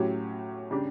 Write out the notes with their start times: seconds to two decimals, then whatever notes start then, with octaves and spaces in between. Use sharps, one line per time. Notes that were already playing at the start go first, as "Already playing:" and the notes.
Already playing: A2 F#3 C#4 G4
0.71 C#3 G3 D4 G4